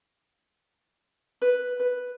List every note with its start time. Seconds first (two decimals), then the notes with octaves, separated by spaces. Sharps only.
1.42 B4
1.80 B4